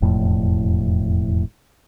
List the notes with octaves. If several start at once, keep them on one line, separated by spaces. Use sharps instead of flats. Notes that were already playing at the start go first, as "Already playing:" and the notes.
E1 F2 A2